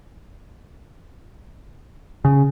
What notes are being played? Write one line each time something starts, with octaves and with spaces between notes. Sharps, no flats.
C#3